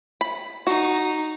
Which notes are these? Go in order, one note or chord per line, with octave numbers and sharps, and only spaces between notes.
B5
D#4 F#4